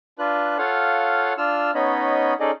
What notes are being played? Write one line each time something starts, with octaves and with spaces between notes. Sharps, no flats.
D4 F4 B4 F#6
F4 A4 C#5 F5 F#5
D4 F4 E6 F6
B3 C#4 D#4 C#5 D#5 B5
C#4 D#4 G#4 A4 D5 D#5